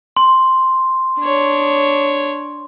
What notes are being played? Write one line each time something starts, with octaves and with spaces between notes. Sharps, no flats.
C6
D4 C#5